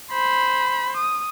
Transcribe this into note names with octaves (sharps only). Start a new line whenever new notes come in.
C5 B5
D#6